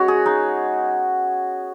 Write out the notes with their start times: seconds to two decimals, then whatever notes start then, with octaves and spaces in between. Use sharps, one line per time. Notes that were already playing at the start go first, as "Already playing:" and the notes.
Already playing: G#3 B3 C#4 F#4 C#5
0.08 G#4
0.26 G#3 D#4